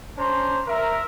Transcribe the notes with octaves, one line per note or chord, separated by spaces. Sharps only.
C#4 D4 C5 A#5 C6
A#4 E5